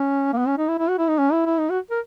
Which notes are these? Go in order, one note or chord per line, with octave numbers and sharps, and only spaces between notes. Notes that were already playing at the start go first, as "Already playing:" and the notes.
Already playing: C#4
A#3
B3
C#4
D#4
E4
E4
F#4
E4
D#4
C#4
E4
E4
D#4
F#4
A#4